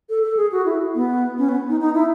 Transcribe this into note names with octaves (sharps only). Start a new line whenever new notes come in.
A4
A4
G#4
F#4
E4
B3
C#4
B3
D#4
D#4
E4